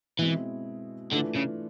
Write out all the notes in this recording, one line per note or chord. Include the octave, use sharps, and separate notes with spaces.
B2 E3 G#3 C4 E4
D3 E3 A3 D4 F4
C#3